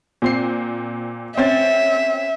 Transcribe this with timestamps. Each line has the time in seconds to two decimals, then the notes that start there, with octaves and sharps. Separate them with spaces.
0.22 A#2 C4 C7
1.37 C4 C#4 E5 A6